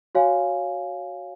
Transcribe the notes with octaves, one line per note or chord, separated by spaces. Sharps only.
F#4 C#5 F5 G#5